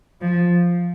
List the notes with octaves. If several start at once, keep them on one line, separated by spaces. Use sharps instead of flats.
F3